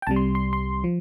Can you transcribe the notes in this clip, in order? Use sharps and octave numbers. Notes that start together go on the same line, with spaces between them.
G5
C2 C3 G3 A5
C6
C6
C6
F3